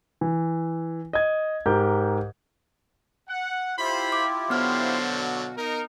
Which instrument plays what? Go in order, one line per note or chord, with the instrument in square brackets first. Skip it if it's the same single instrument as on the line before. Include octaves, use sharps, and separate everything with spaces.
[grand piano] E3
D#5 G#6
G#2 G4 A#4 G6
[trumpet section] F#5
[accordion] E4 F4 G4 [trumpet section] C5 B5
[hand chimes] D6
[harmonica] D3 F#3 [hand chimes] B3 F6 [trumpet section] C5
[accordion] B2 F#4
[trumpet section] D#4 A#4